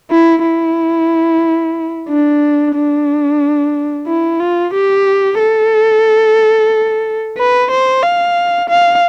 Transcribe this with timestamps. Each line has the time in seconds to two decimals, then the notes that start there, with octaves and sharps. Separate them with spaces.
0.11 E4
0.43 E4
2.09 D4
2.75 D4
4.07 E4
4.40 F4
4.73 G4
5.39 A4
7.37 B4
7.71 C5
8.03 F5
8.69 F5